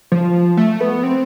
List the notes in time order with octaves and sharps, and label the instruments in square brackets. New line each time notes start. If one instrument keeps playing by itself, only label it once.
[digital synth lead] F3
A3
B3
C4